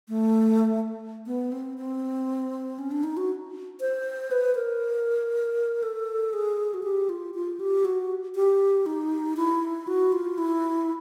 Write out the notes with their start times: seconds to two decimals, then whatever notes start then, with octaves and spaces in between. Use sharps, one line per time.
0.08 A3
1.26 B3
1.52 C4
1.78 C4
2.79 C#4
2.91 D4
3.03 D#4
3.17 F#4
3.81 C5
4.31 B4
4.55 A#4
5.83 A4
6.33 G#4
6.74 F#4
6.83 G4
7.09 F4
7.34 F4
7.60 G4
7.85 F#4
8.35 G4
8.86 D#4
9.37 E4
9.87 F#4
10.12 F4
10.38 E4